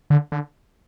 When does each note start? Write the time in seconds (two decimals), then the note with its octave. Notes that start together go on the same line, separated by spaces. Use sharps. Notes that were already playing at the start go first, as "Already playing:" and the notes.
0.10 D3
0.32 D3